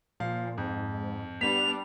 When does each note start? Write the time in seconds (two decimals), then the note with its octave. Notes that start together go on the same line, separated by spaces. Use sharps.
0.20 A#2 F3 F5
0.58 F2 G#2
1.41 G3 B3 D4 B6 F7